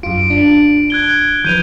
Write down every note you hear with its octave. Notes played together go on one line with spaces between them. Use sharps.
F#2 F4 D7
D4
F#6 G#6 G7
E3 F3 B4 G6 D#7 F7